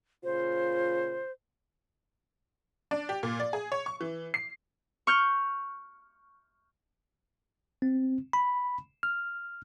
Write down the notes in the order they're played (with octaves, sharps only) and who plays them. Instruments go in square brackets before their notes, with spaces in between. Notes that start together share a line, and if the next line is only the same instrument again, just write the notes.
[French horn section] A#2 C#3 F4 [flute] C5
[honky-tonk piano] D4
G4
A#2
D5
G#4
C#5
C#6
E3
C7
[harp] C#6 F6 G6
[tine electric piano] C4
B5
F6